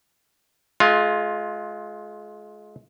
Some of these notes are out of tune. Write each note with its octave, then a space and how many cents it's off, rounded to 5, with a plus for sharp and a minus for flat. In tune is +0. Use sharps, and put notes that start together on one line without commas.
G#3 +30 F4 +10